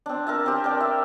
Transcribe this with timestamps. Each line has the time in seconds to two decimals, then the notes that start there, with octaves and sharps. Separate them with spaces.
0.06 C4 D4
0.27 A#4 E5 A5
0.46 C4 G4
0.64 A#4 D5 G5
0.81 E5